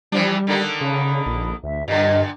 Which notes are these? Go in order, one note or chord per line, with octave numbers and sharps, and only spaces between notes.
E3 F3 G3 D4
D3 D#3 A#3
C#3 B5
A#1
D2 E5
G2 A#2 D3 D#5